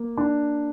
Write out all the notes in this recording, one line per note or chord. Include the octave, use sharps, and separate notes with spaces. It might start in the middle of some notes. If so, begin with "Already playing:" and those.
Already playing: A#3
D4